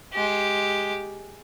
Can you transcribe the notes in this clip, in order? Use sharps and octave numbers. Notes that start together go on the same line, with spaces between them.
G#3 G4